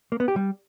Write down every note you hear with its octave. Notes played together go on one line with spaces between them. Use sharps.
A#3
B3
G4
G3